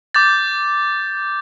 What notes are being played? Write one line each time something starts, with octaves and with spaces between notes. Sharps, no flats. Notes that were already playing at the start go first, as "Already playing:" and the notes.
D6 G6 A6